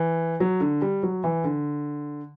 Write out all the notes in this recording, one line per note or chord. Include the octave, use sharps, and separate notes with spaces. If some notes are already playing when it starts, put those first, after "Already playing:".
Already playing: E3
F#3
D3
G3
F#3
E3
D3